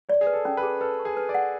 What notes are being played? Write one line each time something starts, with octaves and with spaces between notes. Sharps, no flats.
C#5 D5
G#4
B4
A4
C#4
B4
G#4
A4 B4
C#6
G#4
B4
D5
F#5